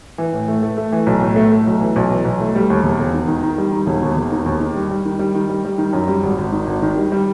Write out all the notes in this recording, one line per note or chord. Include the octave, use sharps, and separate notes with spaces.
E3
A2
A3
A3
A3
E3
B1
A2
A3
A3
B1
E3
B1
E3
B1
A3
G3
D#2
E1
E1
D#3
D#3
D#3
G3
D#3
E1
D#2
E1
D#3
D#2
D#3
G3
G3
D#3
G3
D#3
G3
G3
D#3
F#2
G3
G#1
G#1
D#3
G#1
D#3
G3
G3